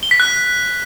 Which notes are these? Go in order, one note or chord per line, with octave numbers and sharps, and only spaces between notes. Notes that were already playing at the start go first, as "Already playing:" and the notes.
G7
B6
F#6